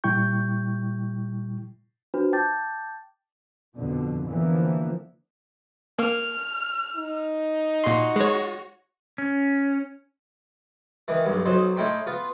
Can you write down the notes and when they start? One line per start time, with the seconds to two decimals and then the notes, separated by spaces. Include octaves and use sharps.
0.04 A#2 G3 E4 G5 C#6 G6
2.14 D4 F4 F#4 B4 C5
2.33 G5 A5 D6 G6 A6
3.78 F2 B2 D3
4.28 D3 E3 F3 A#3 B3
5.99 A#3 F6
6.96 D#4
7.84 A#2 F#4 C6
8.16 G#3 C#5
9.18 C#4
11.08 D#3 E3
11.26 B1 G2
11.46 B1 F#3 D#4 C5
11.77 A2 D#4 E4 G5 C6
12.06 B3 F4